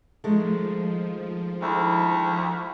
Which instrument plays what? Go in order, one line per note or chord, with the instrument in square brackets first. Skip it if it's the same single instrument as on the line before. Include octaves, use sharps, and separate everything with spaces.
[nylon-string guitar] D#3 G#3 A3 [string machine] F3
[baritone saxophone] D2 [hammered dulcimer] E4 A4